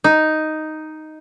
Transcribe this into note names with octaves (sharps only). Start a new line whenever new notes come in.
D#4